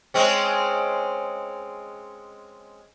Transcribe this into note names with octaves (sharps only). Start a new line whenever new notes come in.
G#3 C4 C#4